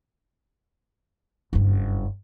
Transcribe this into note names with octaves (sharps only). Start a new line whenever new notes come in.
F#1 G2